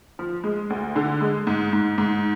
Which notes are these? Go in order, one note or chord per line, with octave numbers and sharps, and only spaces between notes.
F3
G#3
D2
D3
G#3
G#2
G#2
G#2